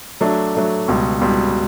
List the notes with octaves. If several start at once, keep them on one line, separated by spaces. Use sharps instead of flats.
F#3 A3 D4
F#3 A3 D4
C#2 B2 G3
C#2 B2 G3